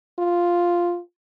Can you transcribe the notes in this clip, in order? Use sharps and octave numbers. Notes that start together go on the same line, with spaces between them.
F4